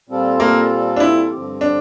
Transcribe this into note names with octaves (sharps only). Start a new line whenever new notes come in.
A#2 G3 C4 F4 A4
A#3
D4
E4
G2 D3 F3 C4 G4
D4